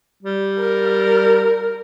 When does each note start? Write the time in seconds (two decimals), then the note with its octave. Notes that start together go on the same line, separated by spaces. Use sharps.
0.23 G3
0.59 A#4